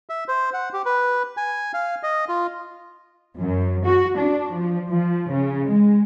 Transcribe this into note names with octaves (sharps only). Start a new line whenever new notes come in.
E5
C5
F#5
G4
B4
G#5
F5
D#5
F4
F#2
F#4
D4
F3
F3
C#3
G#3